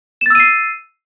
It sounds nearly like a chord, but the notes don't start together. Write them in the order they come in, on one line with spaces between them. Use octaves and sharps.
E7 A6 E6 D#7 C7